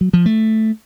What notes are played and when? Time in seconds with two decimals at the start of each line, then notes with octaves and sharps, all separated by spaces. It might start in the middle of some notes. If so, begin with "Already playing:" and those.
0.01 F#3
0.13 F3
0.26 A3